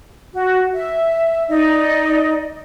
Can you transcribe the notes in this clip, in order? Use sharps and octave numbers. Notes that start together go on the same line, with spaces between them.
F#4
E5
D#4 D5 D#5